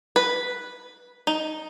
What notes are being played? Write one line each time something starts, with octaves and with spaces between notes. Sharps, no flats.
B4
D#4